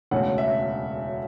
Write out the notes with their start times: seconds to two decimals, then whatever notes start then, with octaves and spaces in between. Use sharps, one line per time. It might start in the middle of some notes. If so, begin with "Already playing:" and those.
0.11 E1 D2 C#3 F#5
0.38 E5